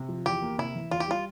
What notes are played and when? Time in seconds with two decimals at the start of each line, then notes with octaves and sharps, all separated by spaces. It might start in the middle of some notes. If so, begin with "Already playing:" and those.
Already playing: C3
0.09 F3
0.26 E2 G4
0.42 A#3
0.58 C3 E4
0.75 E3
0.91 E2 F4
1.00 G4
1.08 G3 F4